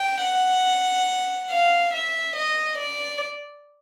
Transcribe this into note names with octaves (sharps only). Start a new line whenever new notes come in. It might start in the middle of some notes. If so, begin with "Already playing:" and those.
Already playing: G5
F#5
F5
E5
D#5
D5